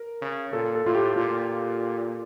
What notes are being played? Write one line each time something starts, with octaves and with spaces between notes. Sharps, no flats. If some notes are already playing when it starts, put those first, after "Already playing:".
Already playing: A#4
C#3
A#2 A4
A4
A2 F4
G4
A#2 F4